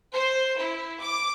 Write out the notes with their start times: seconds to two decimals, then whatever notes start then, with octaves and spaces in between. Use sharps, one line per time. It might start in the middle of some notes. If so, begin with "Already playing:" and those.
0.12 C5
0.57 E4
1.00 D6